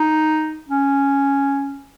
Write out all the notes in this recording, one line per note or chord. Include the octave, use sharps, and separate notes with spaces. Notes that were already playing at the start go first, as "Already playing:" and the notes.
Already playing: D#4
C#4